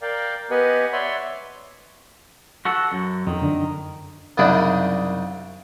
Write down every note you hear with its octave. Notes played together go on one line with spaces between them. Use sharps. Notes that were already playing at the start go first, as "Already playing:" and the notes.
A#4 D5 F5 G5
B3 G4 B4 D#5 F#5 G#5
C#5 D5 E5 F#5 B5 C6
F#4 A4 F#5
F#2
F2 D#3
F#2 D3 D4
C2 F#2 C#3 D4 D#4 B5